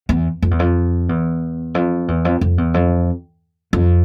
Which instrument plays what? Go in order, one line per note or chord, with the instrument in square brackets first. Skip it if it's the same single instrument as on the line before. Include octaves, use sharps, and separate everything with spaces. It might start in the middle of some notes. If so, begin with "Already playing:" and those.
[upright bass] E2
F2
E2
F2
E2
F2
E2
F2
F2
E2
F2
F2